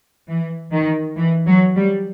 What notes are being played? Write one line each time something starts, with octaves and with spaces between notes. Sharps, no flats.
E3
D#3
E3
F#3
G3